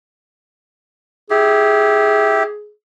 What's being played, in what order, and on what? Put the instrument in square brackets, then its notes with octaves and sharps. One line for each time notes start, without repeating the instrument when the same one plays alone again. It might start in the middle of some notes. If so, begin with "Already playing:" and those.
[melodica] E4 G4 [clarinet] G#4